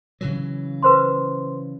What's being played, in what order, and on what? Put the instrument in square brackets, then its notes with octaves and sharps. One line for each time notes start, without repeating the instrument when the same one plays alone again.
[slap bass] C#3 E3 F#3
[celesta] B4 C5 C6